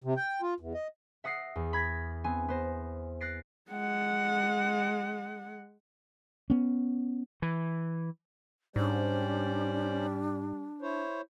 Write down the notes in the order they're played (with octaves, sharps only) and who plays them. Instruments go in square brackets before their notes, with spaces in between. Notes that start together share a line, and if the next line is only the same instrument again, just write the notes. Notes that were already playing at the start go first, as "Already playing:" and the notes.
[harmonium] C3
G5
F4
E2
D#5
[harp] E5 F#5 D#6 A#6 C7 D7
E2
B5 G#6 A#6 B6
B3 C4 G#5
B3 C5 A#6
F#6 A6 A#6 C7 D7
[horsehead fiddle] G#3 F#5
[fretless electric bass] B3 C#4
[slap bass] E3
[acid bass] G#2 [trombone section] G3 [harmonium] C#4 C5 D5 [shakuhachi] D4
[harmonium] E4 C5 C#5